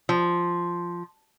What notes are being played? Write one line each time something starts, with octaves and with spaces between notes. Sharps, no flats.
F3